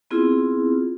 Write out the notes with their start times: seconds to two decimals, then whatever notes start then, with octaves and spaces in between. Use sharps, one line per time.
0.11 B3 C4 E4 F4 G#4